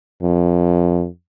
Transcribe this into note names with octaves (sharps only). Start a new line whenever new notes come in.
F2